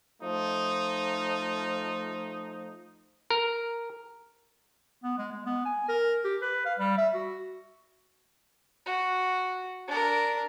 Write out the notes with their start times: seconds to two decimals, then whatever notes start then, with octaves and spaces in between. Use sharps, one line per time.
0.21 F3 A3 D#4
3.31 A#4
5.04 B3
5.18 G#3
5.31 G#3
5.46 B3
5.65 G#5
5.88 A#4
6.24 G4
6.41 B4
6.65 F5
6.78 G3
6.97 E5
7.14 F#4
8.86 F#4
9.88 D4 A#4